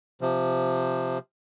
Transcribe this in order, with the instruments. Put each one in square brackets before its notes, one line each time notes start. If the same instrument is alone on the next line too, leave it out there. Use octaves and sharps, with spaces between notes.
[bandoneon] C3 F3